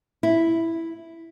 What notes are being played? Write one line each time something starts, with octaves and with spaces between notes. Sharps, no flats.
E4